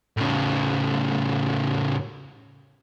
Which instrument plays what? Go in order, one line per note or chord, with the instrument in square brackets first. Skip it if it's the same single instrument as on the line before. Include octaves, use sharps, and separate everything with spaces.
[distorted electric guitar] A2 C#3